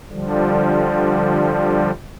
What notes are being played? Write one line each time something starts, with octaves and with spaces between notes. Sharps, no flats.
D3 F3 G3